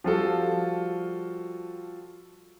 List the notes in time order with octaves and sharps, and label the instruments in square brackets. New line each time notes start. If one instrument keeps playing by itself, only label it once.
[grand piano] F3 G3 F4 F#4 A4